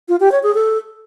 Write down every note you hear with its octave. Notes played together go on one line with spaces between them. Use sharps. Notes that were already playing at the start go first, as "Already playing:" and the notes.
F4
G4
C#5
G#4
A4